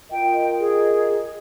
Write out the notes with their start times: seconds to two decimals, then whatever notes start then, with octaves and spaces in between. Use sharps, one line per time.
0.12 F4 A#4 D#5 G5
0.60 G#4